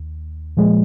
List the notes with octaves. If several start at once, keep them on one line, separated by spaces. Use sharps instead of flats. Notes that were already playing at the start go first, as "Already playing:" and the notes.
Already playing: D#2
A#2 F3 G#3